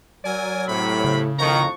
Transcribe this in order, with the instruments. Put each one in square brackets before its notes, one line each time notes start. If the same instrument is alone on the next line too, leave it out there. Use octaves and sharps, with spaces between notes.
[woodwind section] F#3 [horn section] A#4 D5 G#5
[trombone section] A2 [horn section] C3 C4 B5
[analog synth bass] C#3
[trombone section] F2 A2 D#3 [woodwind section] F3 D4 C#6 [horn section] A#5